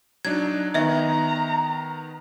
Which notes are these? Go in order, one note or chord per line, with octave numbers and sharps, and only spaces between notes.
F#3 D4 D#4 G#6
D#3 B3 D#5 E5 A#5